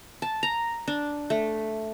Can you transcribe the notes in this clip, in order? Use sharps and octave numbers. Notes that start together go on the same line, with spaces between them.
A5
A#5
D4
A3